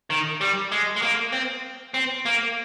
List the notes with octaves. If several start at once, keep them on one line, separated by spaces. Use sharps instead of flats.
D#3
G3
G#3
G#3
A#3
C4
C4
A#3